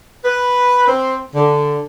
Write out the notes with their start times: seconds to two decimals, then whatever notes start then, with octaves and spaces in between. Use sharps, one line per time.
0.25 B4
0.87 C4
1.35 D3